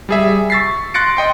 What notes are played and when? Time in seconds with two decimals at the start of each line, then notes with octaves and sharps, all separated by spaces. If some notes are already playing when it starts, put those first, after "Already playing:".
0.09 G3 G#4 E5
0.50 C#6 E6 A6 B6 C7
0.94 C6 F#6 A6 A#6 C#7 D7
1.17 D#5 G5 C6